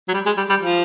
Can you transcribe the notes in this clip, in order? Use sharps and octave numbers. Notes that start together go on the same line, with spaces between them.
F#3
G3
G#3
G3
G3
F3